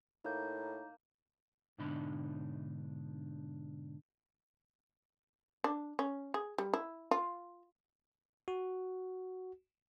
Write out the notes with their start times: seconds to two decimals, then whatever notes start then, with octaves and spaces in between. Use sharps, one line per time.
0.24 A2 A#3 D#4 G6
1.78 G#2 B2 D3 D4 D#4 B5
5.64 D4
5.99 C#4
6.34 G#4
6.58 G3
6.74 E4
7.11 F4
8.48 F#4